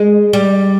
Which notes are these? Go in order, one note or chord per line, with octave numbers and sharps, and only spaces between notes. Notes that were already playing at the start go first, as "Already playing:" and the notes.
Already playing: G#3
G3